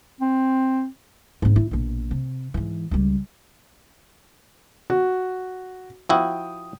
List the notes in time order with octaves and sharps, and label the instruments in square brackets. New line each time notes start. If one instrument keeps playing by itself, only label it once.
[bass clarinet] C4
[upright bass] G#2 C4
E4
A#1 B2
C3
G#2 E3
C#2 G3
[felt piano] F#4
[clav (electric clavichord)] F3 E4 F#4 [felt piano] G5 D#6